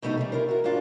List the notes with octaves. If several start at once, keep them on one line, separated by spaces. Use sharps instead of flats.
E2 B2 G3 A3 B3 D#4
C#3 E3 G3
E4 F4 A#4 C5
F#4 A#4
G#2 C#4 D4 F4 F#4 G#4